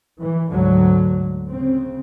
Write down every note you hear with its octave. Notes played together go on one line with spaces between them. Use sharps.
E3
D2 G#2 D3 F#3
C#3 C4